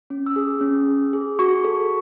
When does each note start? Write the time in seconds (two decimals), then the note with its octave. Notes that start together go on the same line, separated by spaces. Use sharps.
0.10 C#4
0.26 E6
0.36 G#4 D#6
0.61 C#4
0.88 G#4
1.13 G#4
1.39 F#4 C#6
1.64 A4